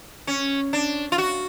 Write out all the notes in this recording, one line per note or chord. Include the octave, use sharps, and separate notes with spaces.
C#4
D4
F4
F#4